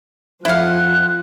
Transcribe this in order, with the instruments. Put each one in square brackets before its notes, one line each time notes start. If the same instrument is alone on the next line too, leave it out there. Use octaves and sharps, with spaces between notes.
[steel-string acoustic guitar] F2 F#5 [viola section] F3 [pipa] E4 F5 [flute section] F#6